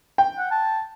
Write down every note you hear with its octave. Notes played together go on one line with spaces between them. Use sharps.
G5
F#5
A5